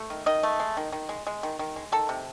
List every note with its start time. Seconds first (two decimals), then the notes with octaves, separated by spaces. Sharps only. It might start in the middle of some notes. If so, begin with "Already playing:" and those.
Already playing: A3
0.10 D#3
0.26 D#3 D#5
0.43 A3
0.60 G#3
0.77 D#3
0.92 D#3
1.09 G#3
1.27 G#3
1.43 D#3
1.59 D#3
1.76 G#3
1.92 D#3 A4
2.09 C3